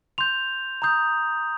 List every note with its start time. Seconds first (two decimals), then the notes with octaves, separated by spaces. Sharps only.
0.18 C6 G6 F7
0.82 A#5 D#6 G6